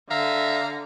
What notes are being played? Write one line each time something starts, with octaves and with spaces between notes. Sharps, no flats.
D3 E5 F5 A#5